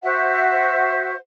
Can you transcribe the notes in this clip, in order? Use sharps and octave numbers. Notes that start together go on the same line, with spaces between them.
F#4 C5 E5 F#5